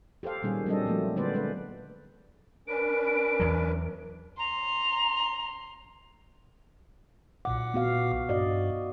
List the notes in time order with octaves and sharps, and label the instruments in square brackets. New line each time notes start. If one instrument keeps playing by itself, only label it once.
[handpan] G4 A4 C5 F5
A#2 D#3 G3 C#4 G#4
F#3 G3 C4 D4 A4 D#5
F3 F#3 A3 A#3
D3 G#3 B3 B4 C5 D5
G#3 B4 D5
[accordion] C#4 D4 B4 [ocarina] A#4 [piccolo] D7
[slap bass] E2 F#3
[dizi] A#5 [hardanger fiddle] C6
[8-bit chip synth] B1 A#2 D6 [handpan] F#5
[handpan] B3 F#4 F5
[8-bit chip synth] G2 [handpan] F#4 D5 D#5